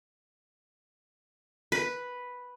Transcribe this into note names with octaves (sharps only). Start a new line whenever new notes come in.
B4